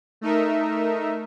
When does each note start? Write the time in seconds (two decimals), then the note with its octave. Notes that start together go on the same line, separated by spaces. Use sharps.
0.21 A3 D#4 A#4 E5